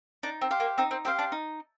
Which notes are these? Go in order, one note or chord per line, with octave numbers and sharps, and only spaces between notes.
D4 D#4
C4
G4 C5 F5
A#3
C4 D#4
C4
C4 G4 C5 F5
D4
D#4